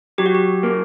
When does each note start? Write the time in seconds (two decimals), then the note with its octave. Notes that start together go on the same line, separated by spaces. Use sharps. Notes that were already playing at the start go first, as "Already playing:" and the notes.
0.18 F#3 G4
0.26 F#4
0.35 G4
0.63 A#3